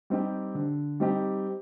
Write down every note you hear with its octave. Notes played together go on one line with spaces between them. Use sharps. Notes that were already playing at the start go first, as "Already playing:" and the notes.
G3 C4 D#4 G4
D3
G3 C4 D#4 G4